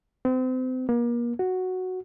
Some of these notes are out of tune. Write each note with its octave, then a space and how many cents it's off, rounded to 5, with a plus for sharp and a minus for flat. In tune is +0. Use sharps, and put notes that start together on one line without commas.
C4 -35
A#3 +35
F#4 +0